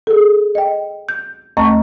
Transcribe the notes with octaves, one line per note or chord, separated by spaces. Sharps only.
G#4 A4
D#5 G5
G6
D#2 A3 D#5 A5 A#5 C#6